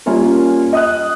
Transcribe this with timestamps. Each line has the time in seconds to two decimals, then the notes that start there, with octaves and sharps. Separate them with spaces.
0.06 G3 A#3 C#4 F4 A#4
0.73 D#5 D#6 F#6